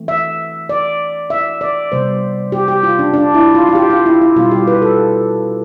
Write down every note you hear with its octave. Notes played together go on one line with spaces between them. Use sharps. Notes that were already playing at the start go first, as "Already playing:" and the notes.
Already playing: E3 A3 C4
E5
D5
E5
D5
C3 G3 B3 C5
G4
G4
F4
D4
D4
E4
F4
F4
G4
F4
E4
E4
B2 G3 C4 F4
G4
B4
A4